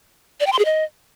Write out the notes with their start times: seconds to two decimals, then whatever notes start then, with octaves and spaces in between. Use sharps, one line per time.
0.40 D5
0.46 G5
0.53 C6
0.59 G#4
0.65 D#5